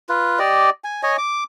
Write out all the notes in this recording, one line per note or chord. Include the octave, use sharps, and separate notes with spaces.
F4 B4
G4 D5 D#5
G#5
C#5 D#5 G#5
D6